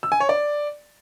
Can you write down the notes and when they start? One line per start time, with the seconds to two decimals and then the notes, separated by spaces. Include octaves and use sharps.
0.03 E6
0.12 G#5
0.20 C#5
0.29 D5